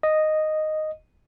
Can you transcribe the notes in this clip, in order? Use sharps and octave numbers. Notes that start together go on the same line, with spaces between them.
D#5